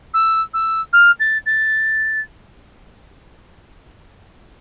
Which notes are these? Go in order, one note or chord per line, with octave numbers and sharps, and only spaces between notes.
E6
E6
F6
A6
A6